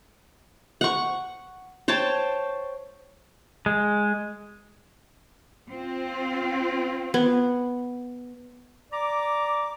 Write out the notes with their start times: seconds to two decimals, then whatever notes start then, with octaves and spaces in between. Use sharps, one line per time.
0.81 F#5 C#6
1.88 C5 C#5 G5 A5
3.66 G#3
5.70 C4 F4
7.14 B3
8.93 D5 A#5 D6